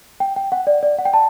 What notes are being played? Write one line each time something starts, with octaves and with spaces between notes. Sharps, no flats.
G5
G5
F#5
D5
D5
F#5
G5
A5